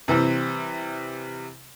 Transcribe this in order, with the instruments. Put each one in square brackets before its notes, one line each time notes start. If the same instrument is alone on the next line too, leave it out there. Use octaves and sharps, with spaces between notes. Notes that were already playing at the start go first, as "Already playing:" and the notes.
[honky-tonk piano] C3 E3 G3 C4